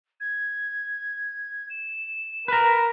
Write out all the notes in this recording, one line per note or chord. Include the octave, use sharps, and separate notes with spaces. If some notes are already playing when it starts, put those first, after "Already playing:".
G#6
E7
A#4 B4 A#5